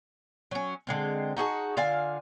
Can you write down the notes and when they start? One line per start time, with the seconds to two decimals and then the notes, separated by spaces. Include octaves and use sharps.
0.51 F#3 C#4
0.87 D3 G#3 C4
1.37 D#4 F#4 G#4 A5
1.77 D3 F4 F5 G#5